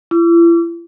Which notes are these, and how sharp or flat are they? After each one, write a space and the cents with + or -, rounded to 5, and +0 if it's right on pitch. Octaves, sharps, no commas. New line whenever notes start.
E4 +40 D6 -40